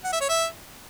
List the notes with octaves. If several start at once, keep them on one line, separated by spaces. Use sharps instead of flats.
F#5
E5
C#5
E5